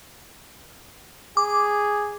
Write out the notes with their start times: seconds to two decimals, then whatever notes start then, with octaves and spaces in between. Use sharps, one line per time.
1.37 G#4 D6